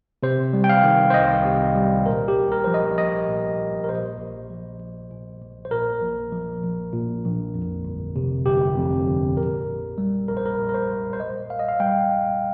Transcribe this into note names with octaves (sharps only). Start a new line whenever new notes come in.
C3 C5
G3
G5
F5
D#3
C5
C2 D#5
C3
G3
A#2 A#4
G4
A#1
A#4
F3 C5
D#5
A#1 D#5
A#2
A#1
A#4
A#2 C5
A#1
F3
A#1
A#2
A#1
C5
A#2 A#4
A#1
F3
A#1
A#2
A#1
F2
G1
C3
G1 G4
F2
G1
A#2 A#4
A#1
G3
A#1 A#4
C5
A#4
A#2
A#4
C5
A#1
C5
A#2 D#5
A#1 F5
D#5
F5
G3 G5
A#1